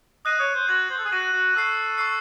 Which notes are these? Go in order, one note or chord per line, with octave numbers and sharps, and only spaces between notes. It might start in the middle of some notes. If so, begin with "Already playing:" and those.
D#5 D#6 F#6 C7 D#7
C#5
C5
F#4 G#6 D#7 F#7
C5
A4
G#4
F#4 G#6 D#7 F#7
F#4
A4 C#6 E6 C7
C#6 E6 C7